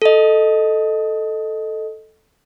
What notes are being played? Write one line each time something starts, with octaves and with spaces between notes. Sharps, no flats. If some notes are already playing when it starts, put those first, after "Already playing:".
A4 D#5